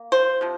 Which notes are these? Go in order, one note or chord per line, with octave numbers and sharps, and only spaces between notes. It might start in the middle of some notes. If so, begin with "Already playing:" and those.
Already playing: A#3
C5
C3 F3